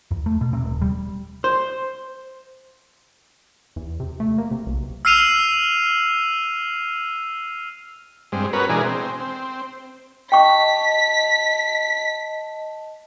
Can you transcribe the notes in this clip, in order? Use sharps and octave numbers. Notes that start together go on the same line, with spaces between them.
E2
A3
B2
C3
D#1
G3
C5
E2
C3
A3
A#3
C3
B1
E6 F6 C7 D#7 F7
G2 G#3 C4
B3 C#4 F#4 A#4 B4
B2 E3 G#3 D4 G#4 A#4
C4
C4
D#5 G5 A5 C#6 B6